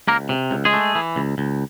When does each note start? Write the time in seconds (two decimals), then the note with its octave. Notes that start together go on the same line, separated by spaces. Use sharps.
0.08 C#2 A#3 A#4
0.29 C3
0.51 C#2
0.65 G#3 G#4
0.73 A3
0.95 E3
1.16 C#2
1.38 C#2